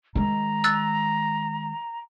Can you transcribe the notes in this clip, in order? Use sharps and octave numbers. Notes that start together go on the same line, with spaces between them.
D#3 G#3 A#5
E6 F#6 A6